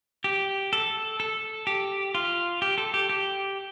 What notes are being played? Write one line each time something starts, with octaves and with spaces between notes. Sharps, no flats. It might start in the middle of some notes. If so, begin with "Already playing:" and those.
G4
A4
A4
G4
F4
G4
A4
G4
G4